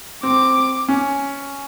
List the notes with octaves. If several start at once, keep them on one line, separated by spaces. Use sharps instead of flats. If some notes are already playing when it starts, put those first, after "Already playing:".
C4 D6
C#4